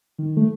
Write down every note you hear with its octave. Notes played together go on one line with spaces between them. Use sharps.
D#3
A3